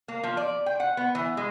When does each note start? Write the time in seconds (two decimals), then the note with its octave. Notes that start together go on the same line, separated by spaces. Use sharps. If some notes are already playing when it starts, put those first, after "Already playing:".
0.08 A#3
0.23 F3
0.37 D5
0.66 G5
0.80 F#5
0.97 B3
1.15 E3
1.37 G#3